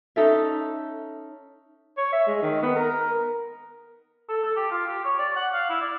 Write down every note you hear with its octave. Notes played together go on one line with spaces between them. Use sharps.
C#4 D#4 A4 E5
C#5
E5
G#3
D#3
B3
A#4
A4
A4
G4
F4
G4
C#5
D5
F#5
F5
E4
D5